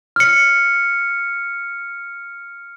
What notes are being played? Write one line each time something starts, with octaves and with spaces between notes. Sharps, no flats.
F6 C#7